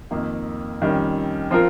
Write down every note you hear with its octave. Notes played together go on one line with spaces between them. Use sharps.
F2 D#3 A#3
F2 D#3 G3 C#4
F3 C4 F4 A#4